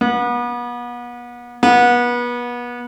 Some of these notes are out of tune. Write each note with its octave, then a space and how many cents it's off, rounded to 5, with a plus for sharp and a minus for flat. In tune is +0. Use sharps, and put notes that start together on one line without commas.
B3 -35
B3 -30